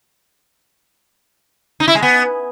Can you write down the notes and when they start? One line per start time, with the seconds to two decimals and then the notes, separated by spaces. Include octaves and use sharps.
1.80 D#4
1.88 E4
1.95 G#3
2.02 B3